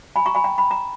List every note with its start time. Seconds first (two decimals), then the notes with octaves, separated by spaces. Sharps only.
0.16 G#5 B5
0.26 A#5 C#6
0.35 G#5 B5
0.44 G5 A#5
0.58 B5
0.71 A#5